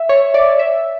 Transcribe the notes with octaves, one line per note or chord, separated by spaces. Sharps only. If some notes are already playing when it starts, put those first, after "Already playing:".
Already playing: E5
C#5
D5
E5